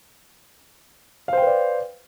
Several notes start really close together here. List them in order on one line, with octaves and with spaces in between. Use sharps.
F5 C5 G5 B4 D5